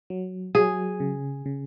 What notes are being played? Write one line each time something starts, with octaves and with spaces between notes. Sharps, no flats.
F#3
F#3 G#4
C#3
C#3